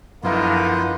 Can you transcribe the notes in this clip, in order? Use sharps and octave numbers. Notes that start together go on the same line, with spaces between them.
F#2 D3 D#3 F3 A#3 B3 E4 F4